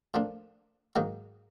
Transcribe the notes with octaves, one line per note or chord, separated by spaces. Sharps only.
A2 F3 A#3 D4
G#2 D#3 F#3 A#3 D#4